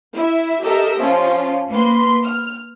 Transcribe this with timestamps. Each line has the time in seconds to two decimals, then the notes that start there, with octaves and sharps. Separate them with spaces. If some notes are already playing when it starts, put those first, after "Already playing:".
0.16 E4 E5
0.63 G4 A4 A#4 D#5 E5 E6
0.97 F3 C#4 F4
1.69 A#3 B4 C6
2.24 F6